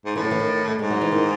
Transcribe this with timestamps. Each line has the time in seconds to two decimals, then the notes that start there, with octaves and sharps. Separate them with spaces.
0.05 G#2
0.15 A2 E3
0.23 F#3
0.31 E3
0.40 D#3
0.68 A3
0.79 G#2 G#3
0.90 F#3
1.01 E3
1.12 D#3